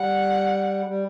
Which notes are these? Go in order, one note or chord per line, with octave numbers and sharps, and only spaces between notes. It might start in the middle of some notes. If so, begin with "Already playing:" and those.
Already playing: G3 F#5
G3